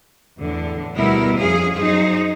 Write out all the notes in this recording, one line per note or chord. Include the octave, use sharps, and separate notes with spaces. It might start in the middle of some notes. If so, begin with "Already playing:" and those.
E2 A2 D3
D2 B2 G3 B3 E4 A#4
F2 C#4 G#4 F5
F#2 D#4 G#4 C5